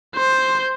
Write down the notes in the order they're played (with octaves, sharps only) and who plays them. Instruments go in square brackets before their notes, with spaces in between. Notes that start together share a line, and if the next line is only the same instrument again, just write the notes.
[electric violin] C5